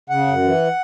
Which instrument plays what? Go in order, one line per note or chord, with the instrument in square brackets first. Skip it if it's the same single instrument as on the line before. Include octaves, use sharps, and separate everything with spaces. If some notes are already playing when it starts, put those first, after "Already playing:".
[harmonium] C#3 F#5
F#2
E3